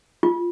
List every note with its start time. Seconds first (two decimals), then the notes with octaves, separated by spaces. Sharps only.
0.23 F4